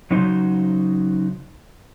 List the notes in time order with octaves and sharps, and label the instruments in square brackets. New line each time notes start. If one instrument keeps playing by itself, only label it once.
[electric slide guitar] C#3 F#3 D#4 F#4 C5